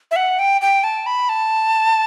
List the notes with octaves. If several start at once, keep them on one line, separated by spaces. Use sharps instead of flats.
E5
F#5
G5
G5
A5
B5
A5